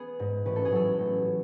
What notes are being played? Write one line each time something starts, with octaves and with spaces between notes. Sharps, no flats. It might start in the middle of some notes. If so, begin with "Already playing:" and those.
Already playing: B3 G#4
G#2
A1 B4
A4
G#4
F#3 A4
A1